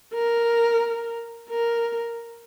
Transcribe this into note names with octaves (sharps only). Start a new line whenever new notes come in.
A#4
A#4